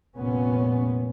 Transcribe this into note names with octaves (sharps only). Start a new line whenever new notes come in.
F1 A#2 B3 C#4